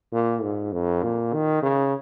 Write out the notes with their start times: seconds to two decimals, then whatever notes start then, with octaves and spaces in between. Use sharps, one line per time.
0.13 A#2
0.42 G#2
0.73 F2
1.03 A#2
1.33 D#3
1.62 C#3